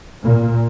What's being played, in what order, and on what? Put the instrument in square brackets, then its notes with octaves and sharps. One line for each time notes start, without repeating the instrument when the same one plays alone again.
[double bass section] A#2